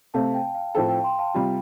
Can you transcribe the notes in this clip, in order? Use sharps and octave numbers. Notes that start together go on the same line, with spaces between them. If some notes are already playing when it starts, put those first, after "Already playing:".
C3 A3 C4 F5 A5
G5
F5
A2 F3 C4 A4 G5
G5
G5 C6
F5 A5
C3 G3 F4 G5